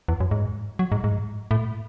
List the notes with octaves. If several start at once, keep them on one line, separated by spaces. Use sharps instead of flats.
E2
F#2
G#2
F#3
G#2
G#2
A2